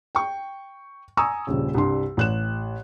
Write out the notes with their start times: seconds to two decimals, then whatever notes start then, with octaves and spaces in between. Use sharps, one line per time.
0.15 G5 C#6
1.17 G#5 A#5 C#6 D#6 E6
1.47 D#1 A#1 C#3
1.74 C2 G2 C6
2.17 A1 F#6 E7